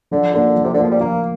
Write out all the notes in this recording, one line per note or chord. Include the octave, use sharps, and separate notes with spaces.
D3 F3
D3 A#3 F4 A#4
F3
C3
D3
F3 A#3 F4 A#4
G3
F3 A#3